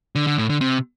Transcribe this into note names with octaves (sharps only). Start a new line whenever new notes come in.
D3
D3
A2
D3
C3